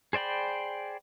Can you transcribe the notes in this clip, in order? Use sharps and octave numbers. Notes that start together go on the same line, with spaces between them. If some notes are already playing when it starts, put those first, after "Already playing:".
G#4 C5 D5 G5 B5